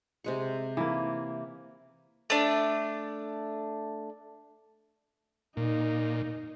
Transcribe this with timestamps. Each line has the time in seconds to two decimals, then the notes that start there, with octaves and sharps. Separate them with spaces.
0.24 C3 G#3 C#6
0.77 E3 A#3
2.30 A3 D4
5.57 A#2 D#4